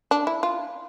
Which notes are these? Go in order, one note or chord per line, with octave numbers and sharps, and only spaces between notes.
D4
E4
F4